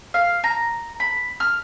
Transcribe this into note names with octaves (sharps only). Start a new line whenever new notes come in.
F5
A#5
B5
F6